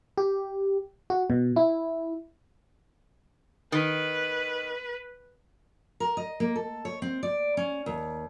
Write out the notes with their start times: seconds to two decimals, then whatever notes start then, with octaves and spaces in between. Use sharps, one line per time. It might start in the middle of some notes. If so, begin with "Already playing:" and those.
0.18 G4
1.10 F#4
1.30 B2
1.56 E4
3.72 D#3 B4
6.00 A#4
6.17 D#5
6.40 A#3
6.55 A4
6.85 C#5
7.02 C4
7.23 D5
7.57 C#4
7.86 D#2